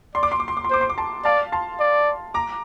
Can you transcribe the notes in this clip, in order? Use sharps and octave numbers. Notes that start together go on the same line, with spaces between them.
D5 C6
D6
C6
D6
C6
D6
C6
C5 D6
C6
D6
A5 C6
D5 F5 A5
A5 C6
D5
A#5 D6